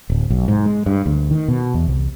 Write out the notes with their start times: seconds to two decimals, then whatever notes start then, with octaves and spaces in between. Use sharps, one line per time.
0.10 D1
0.30 B1
0.48 G#2
0.66 G#3
0.86 G2
1.06 D2
1.31 D#3
1.48 B2
1.74 E2
1.88 C2